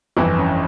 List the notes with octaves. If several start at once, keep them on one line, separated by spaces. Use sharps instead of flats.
G1 F2 E3 E4
C#4